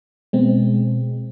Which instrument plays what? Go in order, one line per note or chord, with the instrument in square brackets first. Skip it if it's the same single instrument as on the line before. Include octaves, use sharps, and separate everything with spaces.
[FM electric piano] B2 G#3 C4